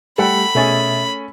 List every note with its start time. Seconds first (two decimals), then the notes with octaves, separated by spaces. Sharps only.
0.18 G3 A3 G4 A4 F#5 G5 B5
0.55 B2 A3 C#4 G#4 E5 A6